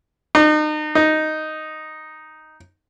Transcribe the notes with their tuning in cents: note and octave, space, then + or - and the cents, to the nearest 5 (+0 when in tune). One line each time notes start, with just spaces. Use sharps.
D#4 -35
D#4 +0